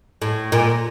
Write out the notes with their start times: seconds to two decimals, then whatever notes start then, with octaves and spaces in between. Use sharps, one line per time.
0.22 A2
0.52 A#2